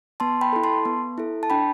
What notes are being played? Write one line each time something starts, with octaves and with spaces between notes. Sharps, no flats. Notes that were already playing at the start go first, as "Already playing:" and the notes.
B3 A5 C6
G5 B5
E4 A4
A5 C6
B3
E4 A4
A5
D4 G5 B5